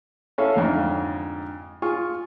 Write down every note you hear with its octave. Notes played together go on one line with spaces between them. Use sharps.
C#4 E4 A4 C#5 F5
F2 G#2 D3 F5
F4 G#4 C#6